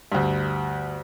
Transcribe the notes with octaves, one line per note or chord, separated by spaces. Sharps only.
D2 G2